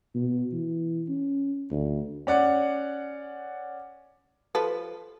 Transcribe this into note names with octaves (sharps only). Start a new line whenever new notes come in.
B2
E3
C#4
D2
C#4 D5 F#5
F3 A4 B4